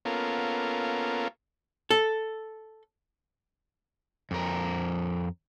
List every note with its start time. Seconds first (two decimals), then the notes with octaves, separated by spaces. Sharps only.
0.05 A#3 B3 C#4 F4 A4 A#4
1.91 A4
4.31 F2 A#4